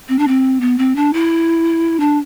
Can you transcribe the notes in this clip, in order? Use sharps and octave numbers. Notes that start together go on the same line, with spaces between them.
C4
D4
C4
B3
C4
D4
E4
D4